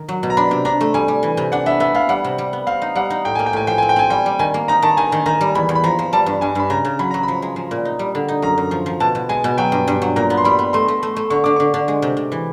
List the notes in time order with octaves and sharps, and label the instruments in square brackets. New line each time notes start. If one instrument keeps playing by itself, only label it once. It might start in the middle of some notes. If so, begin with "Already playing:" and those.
Already playing: [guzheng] D#3
F#3
B2
[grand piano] A#5
[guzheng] D4 [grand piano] B5
[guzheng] C3
[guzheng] D4 [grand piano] A#5
[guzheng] A3
[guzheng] G3 [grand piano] G#5
[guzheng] G3
E3
C3
[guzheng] D4 [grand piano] F#5
[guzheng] B3 [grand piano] E5
[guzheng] B3 [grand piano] E5
[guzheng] B3 [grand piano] F5
[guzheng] G3 [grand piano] F#5
[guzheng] C3
G3
B3
[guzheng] C4 [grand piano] F5
[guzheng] D#4
[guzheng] G3 [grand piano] F#5
[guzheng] D#4
[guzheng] A2 [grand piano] G5
[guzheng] A#3 [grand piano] G#5
[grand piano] G5
[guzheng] A2 [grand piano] G#5
[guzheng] F3 [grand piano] G5
[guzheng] C4 [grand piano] G#5
[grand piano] G5
[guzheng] C4 [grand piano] G#5
[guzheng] G3 [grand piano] G5
[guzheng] G3
[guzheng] D#3 [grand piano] G#5
[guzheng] A#3
[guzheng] D#4 [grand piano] A#5
[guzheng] D#3 [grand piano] A5
[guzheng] D#3 [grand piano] G#5
[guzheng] D#3
[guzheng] D#3 [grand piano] A#5
[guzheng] G3
[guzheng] E2 [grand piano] B5
[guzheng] E2
[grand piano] B5
[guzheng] F3 [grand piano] A#5
[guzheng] F3
[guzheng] G3 [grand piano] A5
[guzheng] G2
[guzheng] G2 [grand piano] G#5
[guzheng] G2 [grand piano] B5
[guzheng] C#3 [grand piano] A#5
[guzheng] C#3
[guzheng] F#3 [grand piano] B5
[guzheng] F#3 [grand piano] A#5
[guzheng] F3 [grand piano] B5
[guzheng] G#3
F3
A#2
D#4
G3
D3
D#4
[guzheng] F#2 [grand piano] A#5
[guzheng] F#2
F3
F3
[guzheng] B2 [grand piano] A5
[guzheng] B2
[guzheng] G#3 [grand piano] G#5
[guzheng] B2
[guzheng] F#3 [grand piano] G5
[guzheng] G2
G2
F#3
[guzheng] A#2 [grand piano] A#5
[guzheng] B3
[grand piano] C6
[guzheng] G3 [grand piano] B5
[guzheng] B3
[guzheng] A3 [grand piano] C6
[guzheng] A3
A3
A3
[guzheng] D3 [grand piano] C#6
[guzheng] D3 [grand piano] D6
[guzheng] D3 [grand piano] C#6
[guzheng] D3
G#3
C3
C3
E3